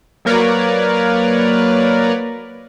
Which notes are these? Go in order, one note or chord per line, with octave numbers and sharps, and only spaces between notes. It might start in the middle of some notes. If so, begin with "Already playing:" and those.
F#3 A#3 A#4 B4 C#5 D5